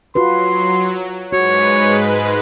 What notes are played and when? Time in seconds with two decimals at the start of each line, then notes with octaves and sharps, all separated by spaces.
0.15 F#3 F4 F#4 B4 C6
1.33 G#2 G#3 F#4 B4 C#5